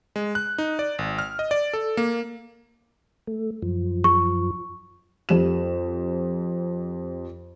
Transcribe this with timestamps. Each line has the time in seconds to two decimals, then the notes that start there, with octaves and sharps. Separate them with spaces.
0.16 G#3
0.35 F#6
0.58 D#4
0.79 D5
0.99 G#1
1.19 F6
1.39 D#5
1.51 D5
1.73 A4
1.97 A#3
3.27 A3
3.62 F#2 F3
4.04 C#6
5.29 F2 G4 E7